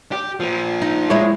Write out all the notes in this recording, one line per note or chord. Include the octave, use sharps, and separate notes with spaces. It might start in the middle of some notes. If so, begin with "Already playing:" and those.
G4
F3 A#3
D#4
G#3 E4 C#5